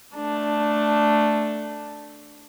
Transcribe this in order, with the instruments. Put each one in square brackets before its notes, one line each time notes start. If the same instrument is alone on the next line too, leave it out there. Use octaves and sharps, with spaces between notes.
[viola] A3 D4